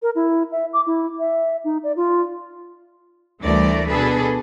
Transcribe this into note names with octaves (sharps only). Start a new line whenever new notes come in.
A#4
E4
E5
D6
E4
E5
D#4
D5
F4
D2 E3 G3 A3 A#4 D5
B2 D4 G#4 A4 B4